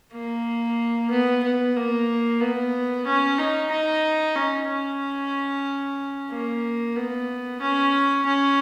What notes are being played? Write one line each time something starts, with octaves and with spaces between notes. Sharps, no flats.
A#3
B3
B3
A#3
B3
C#4
D#4
D#4
C#4
C#4
A#3
B3
C#4
C#4